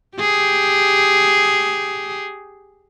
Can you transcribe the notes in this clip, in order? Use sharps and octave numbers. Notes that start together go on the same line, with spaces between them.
G4 G#4